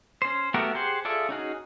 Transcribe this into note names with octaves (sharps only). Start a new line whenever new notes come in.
C#4 C5
A3 B3 F#4 G4 A#4
G4 G#4 C5 F#5
F4 G#4 A4 D5 E5
C#4 D#4 F#4 G#4